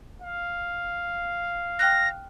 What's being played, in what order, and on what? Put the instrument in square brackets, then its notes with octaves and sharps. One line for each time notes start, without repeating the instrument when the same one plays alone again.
[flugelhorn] F5
[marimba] G5 F6 F#6 [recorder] A#6